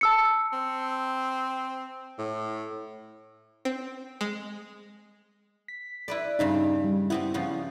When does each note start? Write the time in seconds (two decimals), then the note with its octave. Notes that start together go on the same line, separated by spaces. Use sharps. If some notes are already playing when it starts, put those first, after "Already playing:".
0.01 A5 E6 C#7
0.53 C4
2.19 A2
3.65 C4
4.21 G#3
5.68 B6
6.08 E4 B4 D5
6.39 G2 C#3 D#4 B5
6.84 G3
7.10 B3 C4 E4 G4
7.34 C#3 F3 B3